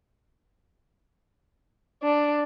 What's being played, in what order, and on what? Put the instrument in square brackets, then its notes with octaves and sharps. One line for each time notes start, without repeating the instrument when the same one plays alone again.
[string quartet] D4